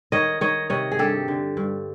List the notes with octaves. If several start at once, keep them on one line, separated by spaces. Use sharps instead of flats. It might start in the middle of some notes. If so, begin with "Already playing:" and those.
D#3 C#5 D#5
D#3 C#5 D#5
C3 C#5 D#5
G#4
G2 G4 A4
D3
G2